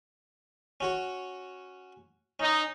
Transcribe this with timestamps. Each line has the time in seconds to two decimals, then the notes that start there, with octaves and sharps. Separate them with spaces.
0.81 C#4 F#4 C#5
2.40 C#4 D#4